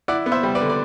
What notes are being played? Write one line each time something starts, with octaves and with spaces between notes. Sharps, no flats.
E4 D5 F#5
B3
C5 E5
G3
B4 D5
D3
D5